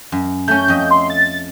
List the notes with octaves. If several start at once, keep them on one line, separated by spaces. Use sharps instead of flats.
F#2
A3 C#4 G6
F2 D#5 E5
C6
A6